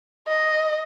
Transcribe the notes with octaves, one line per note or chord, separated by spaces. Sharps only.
D#5